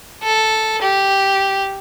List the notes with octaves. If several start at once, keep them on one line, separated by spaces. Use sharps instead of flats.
A4
G4